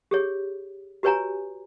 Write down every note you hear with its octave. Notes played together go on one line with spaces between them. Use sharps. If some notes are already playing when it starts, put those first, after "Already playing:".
G4 G#4 C#5
F#4 G4 B4 C#5 G#5 A#5